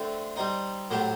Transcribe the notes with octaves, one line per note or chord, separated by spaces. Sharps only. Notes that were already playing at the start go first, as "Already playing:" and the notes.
Already playing: D3 A3 C4
G3 C4 D#4
A2 F#3 A3 C4 G4